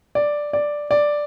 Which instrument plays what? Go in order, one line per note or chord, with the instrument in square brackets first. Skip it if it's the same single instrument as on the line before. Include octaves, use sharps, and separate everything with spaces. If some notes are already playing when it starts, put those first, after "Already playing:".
[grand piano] D5
D5
D5